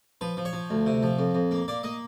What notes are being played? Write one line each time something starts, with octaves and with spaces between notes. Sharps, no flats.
F3 B4
F3
C#5
F3
D2
C3
F3
F2
F2
A#3
A#3 D5
A#3 D#5